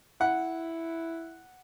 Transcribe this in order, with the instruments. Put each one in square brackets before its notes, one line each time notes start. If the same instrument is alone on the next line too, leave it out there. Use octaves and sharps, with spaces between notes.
[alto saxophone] E4 [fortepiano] F#5